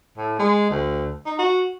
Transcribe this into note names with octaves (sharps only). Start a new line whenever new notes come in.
A2
G#3
D2
D#4
F#4